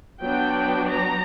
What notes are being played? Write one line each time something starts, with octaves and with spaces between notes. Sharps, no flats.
F#3 B3 D4 G5
A#5